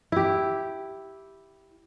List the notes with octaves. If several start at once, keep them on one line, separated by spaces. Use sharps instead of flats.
E4 G4